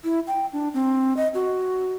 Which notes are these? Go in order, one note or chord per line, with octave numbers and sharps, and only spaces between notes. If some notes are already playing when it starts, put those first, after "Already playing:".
E4
G5
D4
C4
D#5
F#4